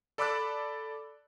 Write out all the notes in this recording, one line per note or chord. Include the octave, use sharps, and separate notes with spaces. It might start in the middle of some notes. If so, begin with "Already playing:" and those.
A4 D5 B5 D6 E6 F#6